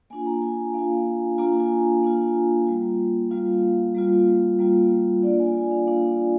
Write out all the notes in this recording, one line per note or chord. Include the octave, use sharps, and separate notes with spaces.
A#3 D4 F4 G#5
A#5
G#5
A#3 D4 F4 F5
A#3 D4 F4 A#5
G#5
A#3 D4 F4
G3 A#3 F4
G3 A#3 F4 F5
G3 A#3 F4
G3 A#3 F4
A#3 D4 F4 D5
G#5
G#5
F5
A#3 D4 F4